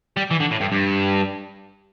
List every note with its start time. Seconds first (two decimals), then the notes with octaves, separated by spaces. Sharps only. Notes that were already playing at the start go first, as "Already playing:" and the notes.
0.17 G3
0.31 E3
0.40 D3
0.51 A2
0.61 G2
0.72 G2